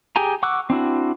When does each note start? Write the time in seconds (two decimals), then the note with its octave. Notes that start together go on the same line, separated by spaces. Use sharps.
0.16 G4 G#4 G5 G#5 A#5
0.43 F#5 C#6 D6 E6 F#6
0.70 C4 D4 E4 F#4